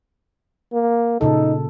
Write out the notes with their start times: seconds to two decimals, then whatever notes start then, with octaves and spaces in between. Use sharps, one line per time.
0.73 A#3
1.21 A#2 C#3 D#4 A4